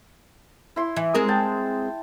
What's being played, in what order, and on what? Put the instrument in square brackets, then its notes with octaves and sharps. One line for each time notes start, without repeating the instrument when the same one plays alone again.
[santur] E4 C6
[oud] E3
G#3 C4 A#4
[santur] G5 A5